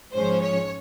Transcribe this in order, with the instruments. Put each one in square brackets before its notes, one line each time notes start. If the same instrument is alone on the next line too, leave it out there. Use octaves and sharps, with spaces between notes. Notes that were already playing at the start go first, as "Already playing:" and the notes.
[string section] G#2 F3 G#3 C#4 C5
C#5